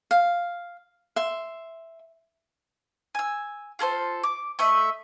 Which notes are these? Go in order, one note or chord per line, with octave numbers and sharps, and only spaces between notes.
F5
E5 C6
G#5 E6
F4 G#4 A4 C5
D6
A3 D#5 E5